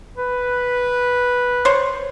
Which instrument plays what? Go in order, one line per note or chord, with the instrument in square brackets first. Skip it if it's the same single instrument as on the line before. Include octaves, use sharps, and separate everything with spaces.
[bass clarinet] B4
[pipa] C5 C#5